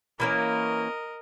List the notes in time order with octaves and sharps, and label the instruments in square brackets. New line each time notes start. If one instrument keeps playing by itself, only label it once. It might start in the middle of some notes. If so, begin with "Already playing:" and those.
[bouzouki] E3 A#3 C#4 [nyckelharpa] A#4 D#5